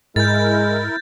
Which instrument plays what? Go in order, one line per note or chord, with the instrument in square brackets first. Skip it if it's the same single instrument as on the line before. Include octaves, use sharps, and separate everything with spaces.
[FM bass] G#2 [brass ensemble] G#3 [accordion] E4 A#4 [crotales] G6 A6